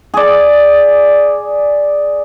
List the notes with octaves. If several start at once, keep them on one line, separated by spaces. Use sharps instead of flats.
G#4 D5